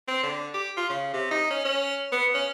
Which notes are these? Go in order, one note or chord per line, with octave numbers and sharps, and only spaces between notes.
C4
D3
G4
F4
C#3
C3
D#4
C#4
C#4
B3
C#4